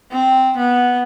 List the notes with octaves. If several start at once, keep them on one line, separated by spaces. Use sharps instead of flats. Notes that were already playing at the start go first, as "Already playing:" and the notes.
C4
B3